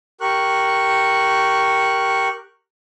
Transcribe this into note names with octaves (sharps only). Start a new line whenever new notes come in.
G4 A#4 C#6 F#6